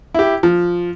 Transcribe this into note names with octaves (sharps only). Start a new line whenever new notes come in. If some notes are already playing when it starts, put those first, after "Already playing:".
E4 G4
F3